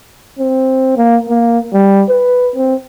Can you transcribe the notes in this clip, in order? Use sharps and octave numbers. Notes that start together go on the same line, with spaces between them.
C4
A#3
A#3
G3
B4
C4